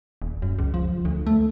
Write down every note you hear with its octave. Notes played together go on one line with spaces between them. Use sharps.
D#1
F#2
C#2
F3
D2
A3